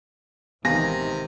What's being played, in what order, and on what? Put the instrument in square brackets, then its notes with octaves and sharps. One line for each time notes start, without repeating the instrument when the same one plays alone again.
[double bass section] G#1 D#3 E3 [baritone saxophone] C3 [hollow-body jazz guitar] B3 F5 G#5 [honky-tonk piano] A#6